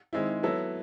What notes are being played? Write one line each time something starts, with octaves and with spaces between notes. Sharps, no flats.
D#3 G#3 C4 E4
F#3 B3 E4 A4